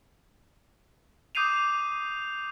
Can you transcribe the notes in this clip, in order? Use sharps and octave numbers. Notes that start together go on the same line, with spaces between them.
D6 D#6 G6 C7 D#7 F7